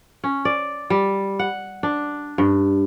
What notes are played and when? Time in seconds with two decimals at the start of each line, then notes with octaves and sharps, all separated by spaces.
0.24 C#4
0.45 D5
0.90 G3
1.39 F#5
1.83 D4
2.38 G2